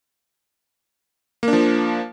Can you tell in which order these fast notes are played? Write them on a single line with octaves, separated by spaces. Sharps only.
A#3 D4 F3